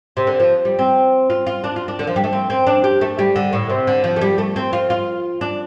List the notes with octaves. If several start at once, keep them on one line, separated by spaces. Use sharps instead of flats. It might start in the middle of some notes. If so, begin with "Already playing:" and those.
C3
D3
F3
G3
C4
F4
F4
D4
F4
D4
D3
F3
G3
A3
C4
C4
D4
G4
A3
G3
D3
A2
C3
D3
F3
A3
G3
A3
C4
F4
F4
D4